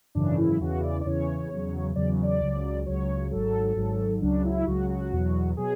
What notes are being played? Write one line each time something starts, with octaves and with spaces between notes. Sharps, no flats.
G#1 F#2 C#3 E3 D4
E4
E2 C#3 E3 F#4
D5
D5
E2 C#3 E3 C#5
E2 C#3 F#3
E2 C#3 F#3 D5
D5
C#2 C#3 F#3
C#2 C#3 F#3 C#5
G#1 G#2 F#3 A4
G#1 G#2 F#3
C#2 C#3 F#3 D4
E4
C#2 C#3 F#3 F#4
F#4
E2 B2 F#3
B2 F#3 G#4